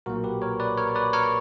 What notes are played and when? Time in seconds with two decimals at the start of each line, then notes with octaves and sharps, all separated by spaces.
0.06 B1 A#2 A#3 F#4 A#4
0.24 G4 B4
0.42 A#4 C#5
0.60 B4 D5
0.78 A#4 C#5
0.95 B4 D5
1.13 A#4 C#5